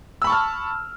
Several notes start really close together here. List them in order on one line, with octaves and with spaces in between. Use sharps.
E6 B5 C#6 A5 F6